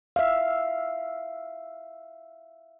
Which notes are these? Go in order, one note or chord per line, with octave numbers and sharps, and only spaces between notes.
E5 F5